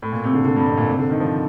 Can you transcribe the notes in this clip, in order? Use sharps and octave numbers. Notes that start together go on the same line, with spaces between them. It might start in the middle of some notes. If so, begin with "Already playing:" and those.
A2
A#2
C3
D3
D3
G2
F2
A#2
C3
D3
D#3
F3